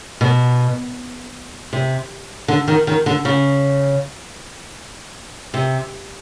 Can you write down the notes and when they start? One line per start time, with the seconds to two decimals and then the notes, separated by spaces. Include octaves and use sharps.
0.21 B2
1.73 C3
2.48 D3
2.68 D#3
2.87 D#3
3.06 D3
3.25 C#3
5.54 C3